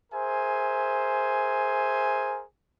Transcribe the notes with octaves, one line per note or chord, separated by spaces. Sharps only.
G#4 A#4 C5 E5 G#5